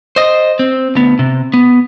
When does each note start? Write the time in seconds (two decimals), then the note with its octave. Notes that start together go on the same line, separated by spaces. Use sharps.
0.16 C5 D#5
0.59 C4
0.95 D2 B3
1.19 C3
1.54 B3